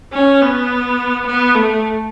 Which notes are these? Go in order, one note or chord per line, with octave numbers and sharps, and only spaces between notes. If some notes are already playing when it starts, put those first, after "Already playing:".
C#4
B3
B3
A3